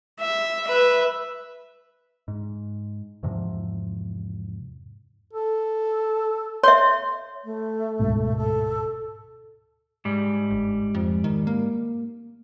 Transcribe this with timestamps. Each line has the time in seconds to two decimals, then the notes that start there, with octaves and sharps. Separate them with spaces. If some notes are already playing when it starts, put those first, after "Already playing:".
0.21 E5
0.68 B4 E5
2.28 G#2
3.23 E2 G#2 C3 F3
5.33 A4
6.63 C#5 E5 C6
7.44 A3
7.99 D1 G#2 B2
8.36 A4
10.05 G#2 G3
10.51 G1
10.94 F2
11.24 D#3
11.47 A#3